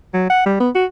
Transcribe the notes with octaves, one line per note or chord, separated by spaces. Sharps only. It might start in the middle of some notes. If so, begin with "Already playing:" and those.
F#3
F#5
G3
B3
F#4